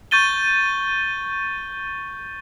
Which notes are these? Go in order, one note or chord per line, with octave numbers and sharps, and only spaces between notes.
C#6 G6 A6 D#7 G7